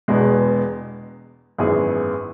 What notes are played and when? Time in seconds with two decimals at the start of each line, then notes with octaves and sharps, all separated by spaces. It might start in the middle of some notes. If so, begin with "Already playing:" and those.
0.08 E1 E2 B2 G#3 B3
1.58 G#1 F#2 E3 B3 G#4